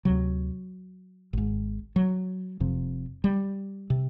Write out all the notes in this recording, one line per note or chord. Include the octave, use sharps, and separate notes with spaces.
D2 C3 F#3
G#1 G#2
F#3
F1 F2 C3
G3
C3